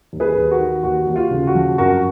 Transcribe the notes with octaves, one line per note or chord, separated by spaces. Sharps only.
D#2
G#4 B4
D#2
F#4 A#4
D#3
D#2 F#4
D#2
F4
C#3
F#4
F3
F#2 F#4 A#4